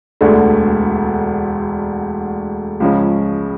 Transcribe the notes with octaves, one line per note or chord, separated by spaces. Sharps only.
E1 D2 D3 A3
C#2 C#3 F3 C#4